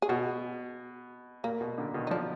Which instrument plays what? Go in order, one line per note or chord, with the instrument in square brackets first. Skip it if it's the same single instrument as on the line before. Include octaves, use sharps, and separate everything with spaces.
[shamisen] G#4
[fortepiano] B2 [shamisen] F#4
[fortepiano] A#2 [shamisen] A#3
[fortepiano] B2
A#2 D3
B2 D#3
[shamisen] D#4
[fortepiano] D3 F3 [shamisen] D4